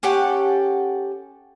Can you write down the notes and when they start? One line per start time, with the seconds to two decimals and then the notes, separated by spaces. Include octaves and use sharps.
0.03 C#4 G4 A4 F#5